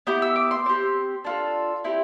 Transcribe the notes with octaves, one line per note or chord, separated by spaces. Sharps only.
B3 E4 G4 D6
E6
D6
C6
C4 G4
D4 F4 A4
C4 E4 G4